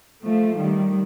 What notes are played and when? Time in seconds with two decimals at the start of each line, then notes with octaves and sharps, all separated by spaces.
0.24 F3 A3
0.58 D#3 G3